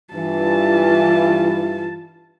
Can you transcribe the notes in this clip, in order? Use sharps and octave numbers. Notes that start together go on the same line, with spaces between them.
G2 E3 F4 A5